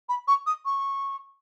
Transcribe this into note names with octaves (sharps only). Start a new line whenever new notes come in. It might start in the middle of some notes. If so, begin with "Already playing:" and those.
B5
C#6
D#6
C#6